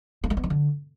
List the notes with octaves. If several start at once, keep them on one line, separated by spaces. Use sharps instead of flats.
A#3
A3
B3
D#3
D3